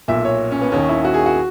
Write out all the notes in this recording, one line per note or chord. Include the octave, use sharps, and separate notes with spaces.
B1 A#2 E5
C#5
C#4
B3
D#2 D#3 C#4
E4
F#4
G#4
F#4